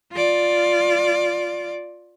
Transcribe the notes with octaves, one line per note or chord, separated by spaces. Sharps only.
F4 D5